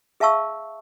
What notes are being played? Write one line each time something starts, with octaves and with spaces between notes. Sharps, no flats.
G#4 E5 F5 A5 C#6 E6